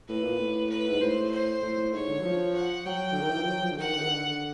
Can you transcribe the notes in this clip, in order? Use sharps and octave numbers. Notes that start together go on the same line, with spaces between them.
A2 B4
A#2
A2
B4
G#2
A2 C5
C5
A2
A2
G#2 C#5
D3
F#3
F3
F#5
F#3 G5
D3
D#3
E3
F3
F#3
F3
D3
D#3 F#5
D3
D#3
D3